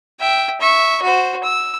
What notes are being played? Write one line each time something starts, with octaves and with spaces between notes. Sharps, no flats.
E5 G5
E5 C#6
F#4 C5
E6